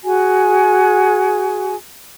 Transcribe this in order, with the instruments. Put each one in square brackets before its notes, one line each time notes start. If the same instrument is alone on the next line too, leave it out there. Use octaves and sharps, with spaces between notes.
[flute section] F#4 G#4 G#5